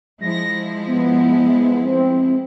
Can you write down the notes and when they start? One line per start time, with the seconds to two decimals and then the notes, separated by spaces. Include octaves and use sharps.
0.21 F3 G#3 E4 A#6
0.87 B3
1.85 C4